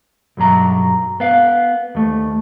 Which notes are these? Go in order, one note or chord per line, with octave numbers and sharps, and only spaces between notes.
B1 G2 F#3 A#5
B3 F5
D#2 A3